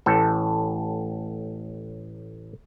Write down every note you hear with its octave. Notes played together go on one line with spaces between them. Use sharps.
A1 A2 A4